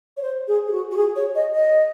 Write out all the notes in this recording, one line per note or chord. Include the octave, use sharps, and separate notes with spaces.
C#5
C5
G#4
G#4
F#4
F#4
G#4
C#5
D#5
D#5